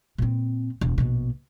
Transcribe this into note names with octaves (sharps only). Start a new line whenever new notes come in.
A#2 C4
E1
A#1 B2